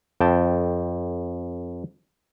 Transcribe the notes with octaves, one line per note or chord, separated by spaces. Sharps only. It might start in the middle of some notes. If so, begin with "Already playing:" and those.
F2 G5 A5